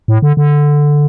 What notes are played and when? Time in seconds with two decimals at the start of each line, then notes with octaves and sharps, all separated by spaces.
0.08 A2
0.22 D3
0.37 D3